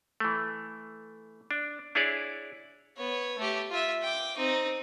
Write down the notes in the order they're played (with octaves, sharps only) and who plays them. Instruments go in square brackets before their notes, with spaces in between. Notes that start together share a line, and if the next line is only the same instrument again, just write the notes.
[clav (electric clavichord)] E3 A3
D4
D4 E4 G#4 C#5 D5
[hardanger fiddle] B3 C#5
A3 G4
F4 E5
G5 D6
C4 D#4